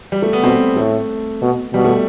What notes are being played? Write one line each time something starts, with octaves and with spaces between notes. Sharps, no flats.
G3
A3
B3
B2 C4
A2 A3
B2
B2 G3
A3